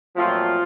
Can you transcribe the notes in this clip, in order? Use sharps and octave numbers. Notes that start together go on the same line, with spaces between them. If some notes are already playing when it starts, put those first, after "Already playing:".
A#2 F3 F#3 A3 C4 F4